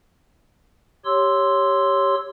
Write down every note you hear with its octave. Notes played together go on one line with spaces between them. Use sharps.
G4 C#5 C6 E6